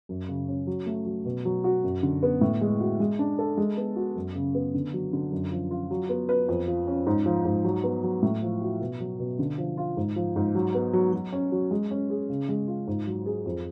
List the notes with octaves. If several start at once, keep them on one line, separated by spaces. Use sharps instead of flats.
F#2
C#3
C#4
F#3
A3
F#3
B2
F#3
F#4
F#2
D3
B3
A2
G#3
F#4
G#3
D4
A4
G#3
B3
F#4
F#2
C#3
B3
D3
F#3
D3
F#2
F3
F4
F#3
B3
B4
F2
F3
C#4
G#2
F3
G#2
F#3
B3
F#3
A2
F3
F#4
B2
F#3
B2
D3
F3
F4
G#2
F3
G#2
F#3
B3
F#3
F#3
C#4
F#3
G#3
C#4
G#4
C#3
G#3
F4
G#2
F#3
G#4
F2